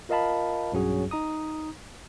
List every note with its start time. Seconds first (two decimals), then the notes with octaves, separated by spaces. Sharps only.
0.09 F4 A#4 D#5 F5 A5 B5
0.72 B1 G2 F#3 C#4 F#4 G#4
1.11 D#4 A#5 D#6